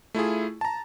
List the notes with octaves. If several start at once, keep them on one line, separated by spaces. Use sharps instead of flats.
A3 E4 F4 G#4
A5 A#5